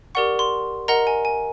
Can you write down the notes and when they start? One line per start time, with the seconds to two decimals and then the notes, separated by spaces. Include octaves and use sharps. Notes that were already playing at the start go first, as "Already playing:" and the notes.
0.15 G4 A#4 D5 F#5 C#6
0.39 C6
0.88 A#4 D#5 F#5 A#5
1.07 G#5
1.25 G#5